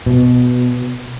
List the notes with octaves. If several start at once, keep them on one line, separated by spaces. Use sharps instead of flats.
B2